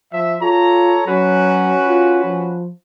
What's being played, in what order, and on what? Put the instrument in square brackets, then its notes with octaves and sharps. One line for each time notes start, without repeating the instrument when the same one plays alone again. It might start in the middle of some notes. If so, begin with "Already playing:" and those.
[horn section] F3 E5
[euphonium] F4 [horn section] A4 C#5 A#5
[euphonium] F#3 [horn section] C#4 F#4 B4
[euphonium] F4
F3